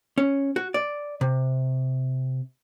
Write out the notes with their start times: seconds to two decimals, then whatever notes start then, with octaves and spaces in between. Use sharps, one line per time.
0.18 C#4
0.56 F#4
0.74 D5
1.21 C3